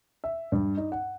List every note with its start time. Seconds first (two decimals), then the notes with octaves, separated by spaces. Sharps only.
0.24 E5
0.52 G2
0.77 D#4
0.92 F#5